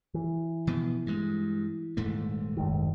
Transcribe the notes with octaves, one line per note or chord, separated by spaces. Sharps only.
E3
B2 F3 B3
G2 G#3
D#1 G#2 A3
F#1 D#3